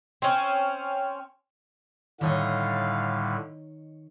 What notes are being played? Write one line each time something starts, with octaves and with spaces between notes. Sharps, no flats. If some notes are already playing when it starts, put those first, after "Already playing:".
C4 C#4
A2 D3 D#3 G3 C#5 D#5 F5